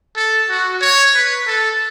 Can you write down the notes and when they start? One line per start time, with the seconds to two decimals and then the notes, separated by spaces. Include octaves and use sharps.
0.16 A4
0.49 F#4
0.81 C#5
1.15 B4
1.47 A4